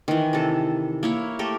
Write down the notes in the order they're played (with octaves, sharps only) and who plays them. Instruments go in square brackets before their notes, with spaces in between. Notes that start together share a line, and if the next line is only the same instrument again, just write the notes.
[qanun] D#3 E3
C3 A4
A#3 E4 C#5
A3 G4 A4 A#4